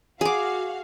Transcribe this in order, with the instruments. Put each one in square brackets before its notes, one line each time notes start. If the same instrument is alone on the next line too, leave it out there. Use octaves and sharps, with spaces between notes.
[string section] F#4 F5 [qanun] G#4 D6